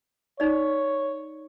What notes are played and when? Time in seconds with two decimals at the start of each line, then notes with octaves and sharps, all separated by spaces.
0.40 D#4 C#5 D5